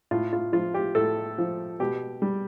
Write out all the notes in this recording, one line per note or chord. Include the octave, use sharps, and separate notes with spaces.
A2 F4
F4
F3 F4
G4
A2 A4
F3
B2 G4
G3